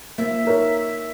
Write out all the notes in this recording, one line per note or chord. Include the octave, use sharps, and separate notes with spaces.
A#3 E5
D#4 A#4 C#5